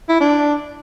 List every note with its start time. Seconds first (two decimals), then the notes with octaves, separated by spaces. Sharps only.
0.09 E4
0.20 D4